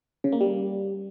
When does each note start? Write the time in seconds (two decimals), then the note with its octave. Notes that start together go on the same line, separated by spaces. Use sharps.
0.24 C#3
0.32 A#3
0.41 G3